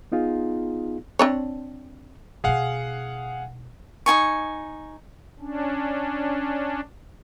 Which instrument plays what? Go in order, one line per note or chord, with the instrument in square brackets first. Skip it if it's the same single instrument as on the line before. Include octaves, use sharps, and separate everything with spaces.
[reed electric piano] B3 D#4 F4 G#4
[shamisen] C4 D4 C#5
[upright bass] B2 D#4 [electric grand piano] G#4 F5 F#5
[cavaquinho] D#4 F4 G#5 C#6
[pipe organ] C#4 D4